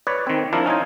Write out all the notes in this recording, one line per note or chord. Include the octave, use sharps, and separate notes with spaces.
B4 C#5 D5
D#3 C4
F3 D4 E4 A#4
C#4 D#4 F4 G#5